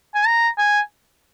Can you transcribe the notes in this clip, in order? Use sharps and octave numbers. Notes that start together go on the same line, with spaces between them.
G#5
A#5
G#5